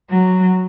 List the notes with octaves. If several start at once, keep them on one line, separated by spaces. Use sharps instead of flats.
F#3